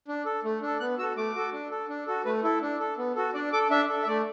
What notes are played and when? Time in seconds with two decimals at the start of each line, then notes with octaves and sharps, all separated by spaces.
0.08 D4
0.26 A4
0.44 A3
0.62 D4 A4
0.80 B3 F#6
0.98 F#4 E6
1.02 A4
1.17 A3 D6
1.35 F#4 A4
1.53 D4
1.71 A4
1.89 D4
2.07 F#4 A4
2.25 A3 B4
2.44 E4 A4
2.62 D4
2.80 A4
2.98 B3
3.16 F#4 A4
3.34 D4 D5
3.53 A4 D6
3.71 D4 E5
3.89 A4
4.03 E5
4.07 A3 D5